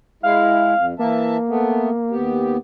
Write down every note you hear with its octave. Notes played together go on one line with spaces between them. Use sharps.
G#3 E4 F5
F2
E3 A#3 E5 A5
A3 B3
D#2 B3 G4